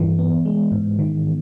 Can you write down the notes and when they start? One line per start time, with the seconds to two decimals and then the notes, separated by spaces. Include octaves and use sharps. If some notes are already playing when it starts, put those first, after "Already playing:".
Already playing: G2 E3
0.19 B3
0.45 G#3
0.72 G#2
0.99 D#3